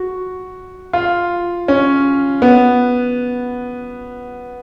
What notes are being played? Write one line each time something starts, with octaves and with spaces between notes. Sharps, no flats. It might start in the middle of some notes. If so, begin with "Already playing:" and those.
Already playing: F#4
F4
C#4
B3